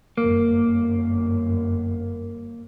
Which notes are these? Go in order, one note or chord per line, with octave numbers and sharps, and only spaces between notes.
G1 F#2 A#3